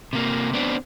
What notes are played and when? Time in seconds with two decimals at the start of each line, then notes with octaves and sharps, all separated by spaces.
0.13 C3 A#3
0.53 B3 C4 D4